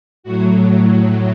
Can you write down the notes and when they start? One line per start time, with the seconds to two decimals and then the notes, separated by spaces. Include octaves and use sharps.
0.23 A2 F#3 F#4